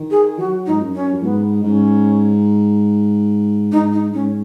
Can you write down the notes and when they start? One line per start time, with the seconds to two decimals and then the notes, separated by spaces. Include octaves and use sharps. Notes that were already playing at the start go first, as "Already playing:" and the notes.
Already playing: D#3
0.11 G#4
0.38 F#3 F#4
0.66 D#4
0.69 G#2
0.80 F#2
0.94 C#4
1.13 F#2
1.22 G#2 B3
1.63 G#2 C#4
3.72 G#2 D#4
3.92 D#4
4.13 G#2 C#4